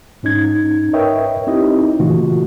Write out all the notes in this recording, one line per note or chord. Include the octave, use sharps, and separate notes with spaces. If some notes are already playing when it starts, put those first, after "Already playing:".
G#2 C#4 D#4 G#6
A#4 B4 C#5 D#5 E5 G5
C4 D#4 E4 G4 D#5
A#2 C#3 E3 A3 F4 F#4